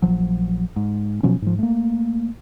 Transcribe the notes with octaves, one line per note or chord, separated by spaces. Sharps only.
A#1 F3 F#3
G#2
B2 F3 F#3 C#4
G#2 F3
A3 A#3